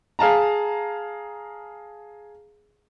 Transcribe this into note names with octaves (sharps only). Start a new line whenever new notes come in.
G#4 F5 A5 A#5